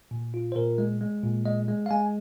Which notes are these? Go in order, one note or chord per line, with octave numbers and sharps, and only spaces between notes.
A#2
F4
C5
A#2 A#4
G#3
G#3
A#2
G#3 D#5
G#3
F5
G#3 G#5